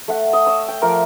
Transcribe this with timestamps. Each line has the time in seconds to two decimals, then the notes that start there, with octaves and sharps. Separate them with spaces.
0.08 A3 F#5
0.33 D#5
0.46 C#5 E6
0.68 G5
0.82 F3 A3 A#4 D6